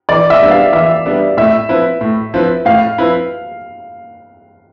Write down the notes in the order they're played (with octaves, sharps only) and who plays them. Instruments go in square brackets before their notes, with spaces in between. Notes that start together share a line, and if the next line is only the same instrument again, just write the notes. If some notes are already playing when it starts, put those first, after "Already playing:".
[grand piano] E3 [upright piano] D5
[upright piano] E5
[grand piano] G3 B3 D4
[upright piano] F5
[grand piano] E3 [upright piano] E5
[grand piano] G3 B3 D4
[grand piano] A2 [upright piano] E5
[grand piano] F3 C4 E4 B4
A2
F3 C4 E4 B4
[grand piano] A2 [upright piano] F5
[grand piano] F3 C4 E4 B4